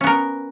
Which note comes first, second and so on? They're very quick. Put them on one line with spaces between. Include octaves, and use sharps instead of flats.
C#4 B3 A#4